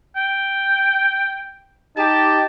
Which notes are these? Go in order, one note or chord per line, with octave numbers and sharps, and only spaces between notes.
G5
D#4 G4 A5